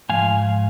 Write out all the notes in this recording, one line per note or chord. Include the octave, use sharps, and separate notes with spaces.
G#2 F3 F5 G#5